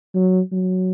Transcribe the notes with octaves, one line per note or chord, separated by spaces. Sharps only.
F#3
F#3